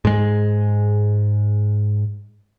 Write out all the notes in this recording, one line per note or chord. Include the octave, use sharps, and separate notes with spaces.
G#2 G#3